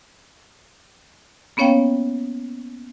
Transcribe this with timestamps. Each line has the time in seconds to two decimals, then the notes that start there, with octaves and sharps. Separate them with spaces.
1.57 A#3 B3 C#4 C#5 F5 G5